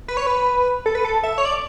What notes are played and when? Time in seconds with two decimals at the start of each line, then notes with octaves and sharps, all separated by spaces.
0.08 B4
0.17 C#5
0.27 B4
0.86 A4
0.95 B4
1.05 A4
1.23 E5
1.38 C#5
1.45 D5